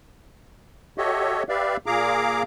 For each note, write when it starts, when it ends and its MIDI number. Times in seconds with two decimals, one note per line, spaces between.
0.98 1.43 66
0.98 1.43 67
0.98 1.43 69
0.98 1.43 73
0.98 1.43 75
0.98 1.43 76
1.49 1.77 67
1.49 1.77 71
1.49 1.77 74
1.49 1.77 76
1.49 1.77 77
1.86 2.43 46
1.86 2.43 68
1.86 2.43 77
1.86 2.43 82
1.86 2.43 86